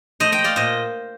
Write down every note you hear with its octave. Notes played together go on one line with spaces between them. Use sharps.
A3 C5 D#5
D#5 G5
A3
D5 F5
A#2 C5 D#5